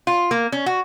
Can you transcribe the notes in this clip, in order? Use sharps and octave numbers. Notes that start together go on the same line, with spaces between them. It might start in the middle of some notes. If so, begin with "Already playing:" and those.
F4
A#3
C#4
F#4